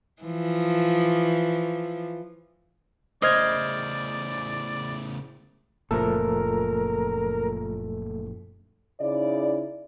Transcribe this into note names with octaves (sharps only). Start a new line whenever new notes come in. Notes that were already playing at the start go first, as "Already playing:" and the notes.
E3 F3
A2 C#3 C5 D5 D#5 F6 G#6
F#1 A#2 F3 A3 A4 A#4
C#3 D#4 E4 D5